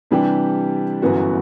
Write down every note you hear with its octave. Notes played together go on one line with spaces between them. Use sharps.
C3 E3 G3 D4 G4
G1 F#2 E3 B3 F#4